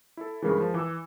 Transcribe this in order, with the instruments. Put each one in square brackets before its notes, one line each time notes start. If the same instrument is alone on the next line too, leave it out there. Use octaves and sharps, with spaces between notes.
[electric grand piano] E4 A4
[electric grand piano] G2 C#3 E3 [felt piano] G#3 G#4 A#4
[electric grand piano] F3
[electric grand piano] E3 [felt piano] D6 E6